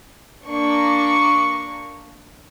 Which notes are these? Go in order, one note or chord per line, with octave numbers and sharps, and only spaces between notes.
A#3 D4 C#6